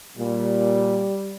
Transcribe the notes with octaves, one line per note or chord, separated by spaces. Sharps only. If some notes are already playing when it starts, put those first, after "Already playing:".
A#2 G3